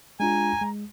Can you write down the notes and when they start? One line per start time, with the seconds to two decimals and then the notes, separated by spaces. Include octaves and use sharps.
0.20 G#3 D4 F4 G#5 A#5
0.61 G#3